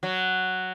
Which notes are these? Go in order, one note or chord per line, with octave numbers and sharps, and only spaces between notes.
F#3